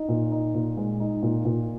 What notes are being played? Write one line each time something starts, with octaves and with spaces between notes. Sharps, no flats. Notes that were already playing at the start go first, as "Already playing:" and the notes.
Already playing: D#4
A#2
D#4
A#2
G#3
D#4
A#2
A#2